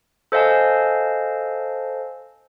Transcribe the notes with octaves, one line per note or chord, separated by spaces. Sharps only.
A4 C5 D#5 F5 G#5 A5